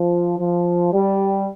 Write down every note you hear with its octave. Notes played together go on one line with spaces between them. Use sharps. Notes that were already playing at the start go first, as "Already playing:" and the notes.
Already playing: F3
F3
G3